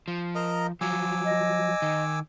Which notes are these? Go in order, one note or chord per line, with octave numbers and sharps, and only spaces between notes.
F3
A#4 D#5 A#5
F3 F#3 G#5 D6 E6
D#5
D#3